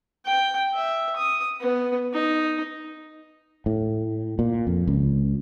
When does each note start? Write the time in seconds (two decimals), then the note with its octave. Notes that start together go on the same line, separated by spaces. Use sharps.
0.25 G5
0.74 E5
1.16 D#6
1.61 B3
2.13 D#4
3.66 A2
4.39 A#2
4.67 F2
4.87 C#2